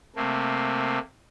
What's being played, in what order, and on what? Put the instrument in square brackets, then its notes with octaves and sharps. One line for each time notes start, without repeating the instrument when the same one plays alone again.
[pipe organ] C3 A3 A#3